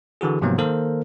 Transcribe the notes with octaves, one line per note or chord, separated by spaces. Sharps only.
D3 E3 F#4 G#4
G#2 C3 F3 F#3 A#3 B3
D#3 A#3 A4 A#4 C5